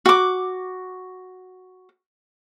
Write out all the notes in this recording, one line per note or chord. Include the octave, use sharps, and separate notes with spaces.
F#4 D6